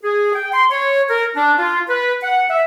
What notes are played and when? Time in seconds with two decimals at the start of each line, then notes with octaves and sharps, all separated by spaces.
0.03 G#4
0.35 G5
0.53 C6
0.71 C#5
1.09 A#4
1.35 D4
1.58 F4
1.89 B4
2.22 F#5
2.50 E5